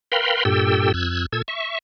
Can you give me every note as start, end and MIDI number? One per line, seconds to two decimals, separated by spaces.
0.12 0.44 70
0.12 0.44 71
0.12 0.44 77
0.12 0.44 79
0.12 0.44 83
0.12 0.44 84
0.45 0.92 43
0.45 0.92 46
0.45 0.92 67
0.45 0.92 69
0.45 0.92 79
0.45 0.92 88
0.94 1.26 41
0.94 1.26 88
0.94 1.26 90
0.94 1.26 92
1.32 1.42 46
1.32 1.42 69
1.32 1.42 88
1.32 1.42 92
1.48 1.78 76
1.48 1.78 85